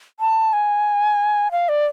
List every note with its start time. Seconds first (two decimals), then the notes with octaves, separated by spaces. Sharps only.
0.20 A5
0.53 G#5
1.52 F5
1.69 D5